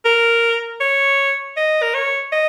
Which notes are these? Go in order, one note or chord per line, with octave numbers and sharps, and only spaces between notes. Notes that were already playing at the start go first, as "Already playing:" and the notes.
A#4
C#5
D#5
A#4
C#5
D#5